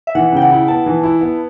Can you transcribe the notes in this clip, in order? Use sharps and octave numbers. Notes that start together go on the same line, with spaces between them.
E5
E3 F#5
C#3 G5
F#5
E4
B3 A5
E3
E4
B3